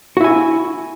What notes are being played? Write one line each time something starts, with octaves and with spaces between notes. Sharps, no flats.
E4 F#4 G#5